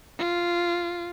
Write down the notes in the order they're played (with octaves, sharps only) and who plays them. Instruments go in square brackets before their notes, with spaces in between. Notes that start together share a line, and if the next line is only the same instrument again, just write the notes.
[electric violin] F4